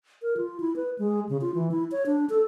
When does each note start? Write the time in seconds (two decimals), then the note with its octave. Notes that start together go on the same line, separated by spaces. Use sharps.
0.22 A#4
0.37 F4
0.60 E4
0.76 B4
0.99 G#3
1.29 C#3
1.41 F4
1.54 E3
1.71 E4
1.92 C#5
2.06 D4
2.30 A4